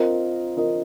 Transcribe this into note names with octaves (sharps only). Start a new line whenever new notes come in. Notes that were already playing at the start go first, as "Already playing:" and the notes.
Already playing: C4 F4 A#4 D#5
C4 F4 A#4 D#5